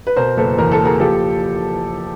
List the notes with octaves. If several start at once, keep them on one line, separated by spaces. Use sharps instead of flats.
B4
B2 A#4 C5
F#1 A4 B4
E2 A#4
A4
F#1
G#4 A#4
F3 G4 A4